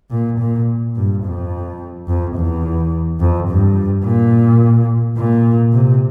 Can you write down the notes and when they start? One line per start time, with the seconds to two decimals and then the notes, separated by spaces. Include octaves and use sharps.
0.11 A#2
0.39 A#2
0.96 G2
1.24 F2
2.08 F2
2.36 E2
3.20 F2
3.49 G2
4.05 A#2
5.17 A#2
5.73 C3